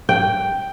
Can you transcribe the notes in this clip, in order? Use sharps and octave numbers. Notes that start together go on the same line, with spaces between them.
G5